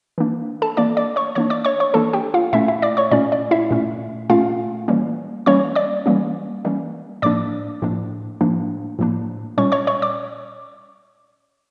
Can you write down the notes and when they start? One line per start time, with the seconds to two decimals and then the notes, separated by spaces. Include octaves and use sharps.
0.18 E3 A#3 D4
0.62 A4 A5
0.77 E3 A#3 D4 D5 D6
0.97 D5 D6
1.16 C#5 C#6
1.35 E3 A#3 D4 C#5 C#6
1.50 D5 D6
1.65 C#5 C#6
1.80 C#5 C#6
1.94 E3 A#3 D4 A4 A5
2.13 G4 G5
2.34 F4 F5
2.53 A#2 A3 C#4 E4 E5
2.68 E4 E5
2.82 D5 D6
2.97 C#5 C#6
3.11 A#2 A3 C#4 D5
3.32 D5
3.51 E4 E5
3.71 A#2 A3 C#4
4.30 A#2 A3 C#4 F4 F5
4.88 E3 G3 A#3 C#4
5.46 E3 G3 A#3 C#4 C#5 C#6
5.75 D5 D6
6.06 E3 G3 A#3 C#4
6.65 E3 G3 A#3 C#4
7.22 A2 F3 A#3 D4 D5 D6
7.82 A2 F3 A#3 D4
8.41 A2 F3 A#3 D4
8.99 A2 F3 A#3 D4
9.58 A#2 G3 C#4 C#5 C#6
9.72 C#5 C#6
9.87 C#5 C#6
10.02 D5 D6